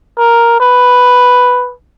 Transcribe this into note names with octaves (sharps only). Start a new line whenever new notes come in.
A#4
B4